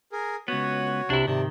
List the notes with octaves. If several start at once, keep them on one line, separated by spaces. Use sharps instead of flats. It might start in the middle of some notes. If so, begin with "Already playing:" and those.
G#4 A#4
C#2 B3 F#4 C#5
C2 C3 D4 E4
G#2 C3 D#3 D5 A5